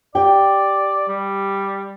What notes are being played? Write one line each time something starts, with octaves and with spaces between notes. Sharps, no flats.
G4 D5 G5
G3